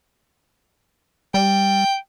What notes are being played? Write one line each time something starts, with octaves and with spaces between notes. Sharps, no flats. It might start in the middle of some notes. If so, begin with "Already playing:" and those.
G3 G5